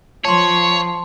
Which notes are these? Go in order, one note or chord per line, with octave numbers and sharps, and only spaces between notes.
F3 C#5 A5 C6